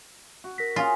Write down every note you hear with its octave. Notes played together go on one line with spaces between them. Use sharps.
F#4
A#4 A#6 B6
C#4 F4 G#4